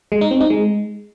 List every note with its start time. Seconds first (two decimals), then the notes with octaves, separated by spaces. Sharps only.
0.12 G#3
0.21 D#4
0.31 C4
0.41 D#4
0.50 G#3